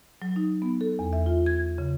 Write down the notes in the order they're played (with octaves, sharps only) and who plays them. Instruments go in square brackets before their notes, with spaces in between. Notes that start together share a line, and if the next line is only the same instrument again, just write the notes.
[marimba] F#3
D#4
B3
A4
E2
E5
F4
G#6
C#3